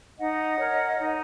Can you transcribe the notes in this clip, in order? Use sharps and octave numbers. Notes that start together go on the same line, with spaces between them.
D#4 D#5 F#5
A#4 C#5
D#4